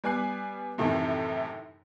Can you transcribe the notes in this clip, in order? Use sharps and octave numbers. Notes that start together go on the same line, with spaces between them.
G3 B3 G#5 D6 F#6 C7
F#2 A2 C3 D#3 E3